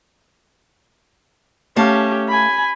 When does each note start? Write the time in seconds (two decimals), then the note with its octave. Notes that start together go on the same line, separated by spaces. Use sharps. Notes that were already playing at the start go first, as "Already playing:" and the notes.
1.76 A3 C#4 G4 F5 A5
2.28 G#5 B5